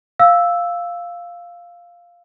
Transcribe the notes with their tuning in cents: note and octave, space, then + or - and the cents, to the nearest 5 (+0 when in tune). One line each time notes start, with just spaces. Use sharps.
F5 +0 E6 +0